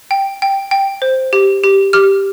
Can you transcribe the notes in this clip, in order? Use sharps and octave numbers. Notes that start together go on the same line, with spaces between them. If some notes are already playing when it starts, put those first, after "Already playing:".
G5
G5
G5
C5
G4
G4
G4 F6